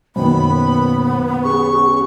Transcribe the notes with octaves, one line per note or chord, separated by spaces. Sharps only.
F#2 B2 D#3 A#3 B3 C5 B5
C#4 G4 G#4 C#6